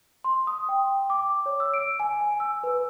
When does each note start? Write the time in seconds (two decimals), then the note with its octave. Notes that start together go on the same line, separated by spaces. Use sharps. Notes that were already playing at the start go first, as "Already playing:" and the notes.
0.24 C6
0.47 D#6
0.69 G5
1.10 D6
1.46 C#5
1.60 E6
1.74 D7
2.00 G#5
2.21 G#5
2.40 E6
2.64 B4